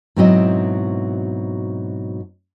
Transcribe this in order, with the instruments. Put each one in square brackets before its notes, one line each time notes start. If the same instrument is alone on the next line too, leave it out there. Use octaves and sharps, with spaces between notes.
[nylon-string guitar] G#2 B2 F#3 C4 E4 D#5